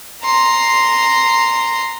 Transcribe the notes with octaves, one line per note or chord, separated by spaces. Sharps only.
A#5 C6